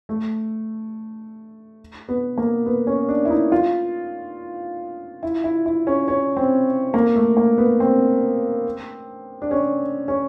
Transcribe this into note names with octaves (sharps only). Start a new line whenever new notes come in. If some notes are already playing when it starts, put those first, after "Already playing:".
A3
B3
A#3
B3
C#4
D4
E4
D#4
F4
E4
E4
E4
C#4
C#4
C4
A#3
A3
A#3
B3
C4
D4
C#4
C#4